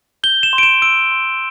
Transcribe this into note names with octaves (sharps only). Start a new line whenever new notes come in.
G6 G7
E7
C6
D7
E7
E6 D7
C6